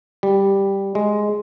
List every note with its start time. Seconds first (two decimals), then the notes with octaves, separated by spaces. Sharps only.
0.23 G3
0.95 G#3